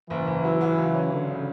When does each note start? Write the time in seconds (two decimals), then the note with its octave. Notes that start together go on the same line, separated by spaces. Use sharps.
0.10 F#1 E3
0.27 F#1
0.44 F#3
0.61 F#3
0.78 C#2
0.95 C#4
1.12 D3 C#4
1.29 C#3